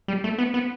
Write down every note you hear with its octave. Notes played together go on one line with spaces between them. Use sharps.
G3
A3
B3
B3